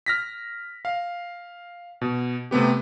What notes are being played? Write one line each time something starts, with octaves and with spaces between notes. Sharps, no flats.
F6 A#6 B6
F5
B2
C3 A3 B3 G4